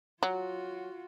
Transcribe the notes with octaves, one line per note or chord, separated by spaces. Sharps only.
F#3 F4 F#4